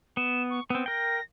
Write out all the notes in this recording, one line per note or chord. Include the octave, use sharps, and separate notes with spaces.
B3 E7
C#6
B3 C4 E6
A#4 G5 A#6